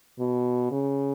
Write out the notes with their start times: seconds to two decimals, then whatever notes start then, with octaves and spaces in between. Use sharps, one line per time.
0.19 B2
0.72 C#3